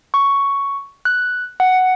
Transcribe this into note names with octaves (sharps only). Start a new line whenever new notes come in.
C#6
F#6
F#5